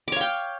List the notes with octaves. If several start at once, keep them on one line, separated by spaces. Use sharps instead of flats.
C#5 F5 G5 D6